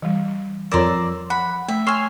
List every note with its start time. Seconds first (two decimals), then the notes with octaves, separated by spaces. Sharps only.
0.02 E3 G3
0.71 F2 A#4 C#5 D5 A#5 C6 E6
1.30 F#5 B5
1.68 A3 E5
1.87 C#5 G#5 C6 E6 F6